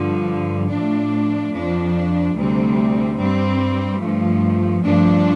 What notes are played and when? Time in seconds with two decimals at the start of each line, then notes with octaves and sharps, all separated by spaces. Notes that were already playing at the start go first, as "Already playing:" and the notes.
Already playing: G2 D3 F3
0.70 A2 F3 D4
1.53 F2 F3 D4
2.35 D2 C3 G3 C4
3.17 G2 G3 C4
4.01 G2 F3 A3
4.82 G2 F3 A3 D4